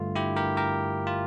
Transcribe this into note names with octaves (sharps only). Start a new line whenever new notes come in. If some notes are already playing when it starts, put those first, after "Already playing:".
Already playing: G2 D3 A3 F4
E4 G4
G4 A#4
G4 A#4
F4